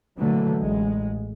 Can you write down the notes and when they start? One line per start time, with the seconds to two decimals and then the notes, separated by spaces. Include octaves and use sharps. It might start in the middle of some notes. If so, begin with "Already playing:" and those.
0.17 A#2 D3 E3 F#3 A3
0.58 A1 G#3